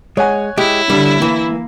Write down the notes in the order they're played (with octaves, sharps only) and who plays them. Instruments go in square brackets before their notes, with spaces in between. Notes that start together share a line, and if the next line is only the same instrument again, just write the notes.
[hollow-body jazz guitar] G#3 [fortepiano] C#5 F#5 G#5
[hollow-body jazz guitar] G#3 G4 [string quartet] E4
[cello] D3 [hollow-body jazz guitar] G3
[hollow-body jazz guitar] E3 [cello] A#3